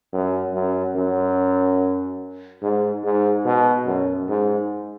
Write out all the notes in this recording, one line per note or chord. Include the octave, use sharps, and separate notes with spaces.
F#2
F#2
F#2
G#2
G#2
B2
F#2
G#2